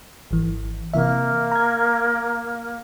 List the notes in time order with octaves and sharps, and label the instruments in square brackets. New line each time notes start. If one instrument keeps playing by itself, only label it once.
[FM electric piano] G#1 E3
[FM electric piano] C3 E3 E5 [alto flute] A#3
[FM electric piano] A#5 G#6